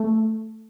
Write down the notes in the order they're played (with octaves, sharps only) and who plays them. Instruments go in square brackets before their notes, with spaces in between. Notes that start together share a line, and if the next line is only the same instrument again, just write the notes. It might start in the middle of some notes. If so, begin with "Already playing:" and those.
Already playing: [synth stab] A3